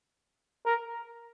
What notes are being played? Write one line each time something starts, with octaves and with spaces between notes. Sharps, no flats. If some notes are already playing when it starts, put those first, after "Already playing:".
A#4